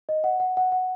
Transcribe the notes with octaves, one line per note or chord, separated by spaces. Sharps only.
D#5
F#5
F#5
F#5
F#5